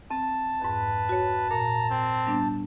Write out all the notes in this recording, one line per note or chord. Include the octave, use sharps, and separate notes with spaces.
C4 A5
F2 G#2 B4
F#4 C#5
A#2 A#5
C4
G3 B3 D4